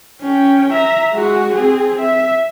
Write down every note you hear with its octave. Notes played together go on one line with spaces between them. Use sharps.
C#4 G5
E5 A#5
G#3 F#4
C4 G#4
E5